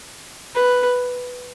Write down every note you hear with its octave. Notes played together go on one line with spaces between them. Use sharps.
B4